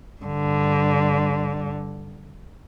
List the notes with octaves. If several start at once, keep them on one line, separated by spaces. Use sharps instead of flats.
G2 D3